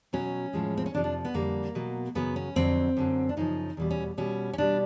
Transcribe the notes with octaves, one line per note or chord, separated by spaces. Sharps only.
B2 F#3 C#4
A2 F3 G#3
C4
C#4
F2 C3 F3 D4
D4
B3
F2 D3 G3 A#3
B2 F#3
F#2 C#3 F#3 B3
C#4
F2 D3 F#3 C4
F#2 D3 F#3
D4
F#2 C#3 F3 D#4
E2 B2 G3
C#4
B2 G3 C#4
C#4
B2 G3 D4